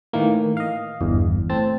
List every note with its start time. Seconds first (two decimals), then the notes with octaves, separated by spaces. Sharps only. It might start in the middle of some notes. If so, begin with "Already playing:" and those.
0.13 A2 D#3 E3 A#3
0.57 D#5 F5
1.01 G1 E2
1.50 A2 C4 A5